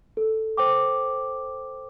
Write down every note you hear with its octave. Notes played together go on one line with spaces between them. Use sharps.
A4
C5 G5 D6